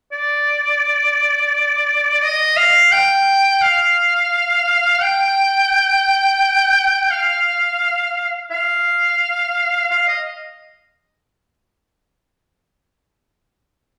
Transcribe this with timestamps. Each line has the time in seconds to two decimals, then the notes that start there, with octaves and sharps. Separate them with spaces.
0.12 D5
2.23 D#5
2.57 F5
2.92 G5
3.62 F5
5.02 G5
7.11 F5
8.51 F5
9.91 F5
10.08 D#5